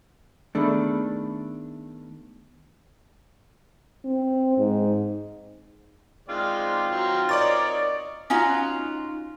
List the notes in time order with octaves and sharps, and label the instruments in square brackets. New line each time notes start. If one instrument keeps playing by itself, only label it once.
[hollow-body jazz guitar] D#3 A3 D4 [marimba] B3 G#4 B5
[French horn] C4
G#2
[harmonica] D#3 G#3 D5 [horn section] C4 F4
[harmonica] D#3 F#3
[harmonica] D#4 A#4 C#5 [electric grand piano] D5 D6 A6
[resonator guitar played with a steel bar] C#4 D#4 F4 F#4